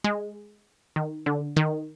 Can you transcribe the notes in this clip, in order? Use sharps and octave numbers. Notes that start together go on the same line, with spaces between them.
G#3
D#3
D3
D#3